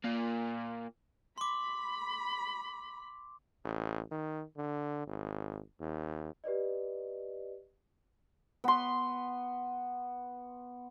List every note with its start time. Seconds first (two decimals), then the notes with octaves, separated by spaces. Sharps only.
0.04 A#2 A#3
1.38 B5 C6 D6
3.64 A1
4.11 D#3
4.57 D3
5.07 G#1
5.80 D#2
6.44 G4 B4 D5 D#5
8.64 B3 C6